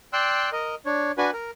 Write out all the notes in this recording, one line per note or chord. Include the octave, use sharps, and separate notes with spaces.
D5 G5 C6 E6 F#6
A#4 D#5
D4 C#5
D4 F#4 B4 G#5
A#4